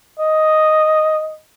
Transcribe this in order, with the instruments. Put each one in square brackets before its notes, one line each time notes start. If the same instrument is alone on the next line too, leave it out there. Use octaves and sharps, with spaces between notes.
[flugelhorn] D#5